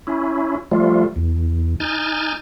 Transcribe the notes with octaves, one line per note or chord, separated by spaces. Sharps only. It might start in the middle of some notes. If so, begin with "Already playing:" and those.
C#4 E4
F3 G3 A3 F4
E2
D#4 G#5 F6 G6 A6